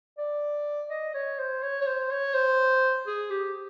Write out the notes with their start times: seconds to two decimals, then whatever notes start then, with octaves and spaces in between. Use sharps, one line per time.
0.18 D5
0.90 D#5
1.14 C#5
1.38 C5
1.62 C#5
1.81 C#5
1.86 C5
2.11 C#5
2.34 C5
3.07 G#4
3.30 G4